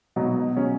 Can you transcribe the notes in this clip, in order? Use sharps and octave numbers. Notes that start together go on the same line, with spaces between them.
B2 F#3 B3 D#4
F#3 C#4 G#4